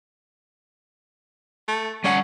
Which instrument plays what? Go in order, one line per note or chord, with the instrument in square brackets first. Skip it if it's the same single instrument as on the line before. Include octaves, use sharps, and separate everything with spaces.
[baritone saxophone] A3
[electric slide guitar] G3 D5 F#5 [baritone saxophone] C#4